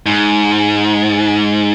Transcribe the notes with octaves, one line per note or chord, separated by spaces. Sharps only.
G#2